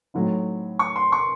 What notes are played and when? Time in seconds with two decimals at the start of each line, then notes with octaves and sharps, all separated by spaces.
0.14 A2 F#3 A3 C4 D#4
0.79 C#6
0.96 C6
1.12 C#6